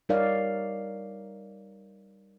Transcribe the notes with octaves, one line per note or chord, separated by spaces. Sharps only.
G3 D#4 A#4 C#5 D5 F5